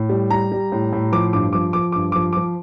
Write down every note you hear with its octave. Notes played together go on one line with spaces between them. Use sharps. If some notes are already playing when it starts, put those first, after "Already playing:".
Already playing: A2
G3
G3 A#5
G3
A2
A2
F3 D6
G2 D6
F3 D6
F3 D6
G2 D6
F3 D6
F3 D6